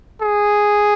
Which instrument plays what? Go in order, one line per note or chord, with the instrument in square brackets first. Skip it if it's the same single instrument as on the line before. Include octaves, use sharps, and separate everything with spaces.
[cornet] G#4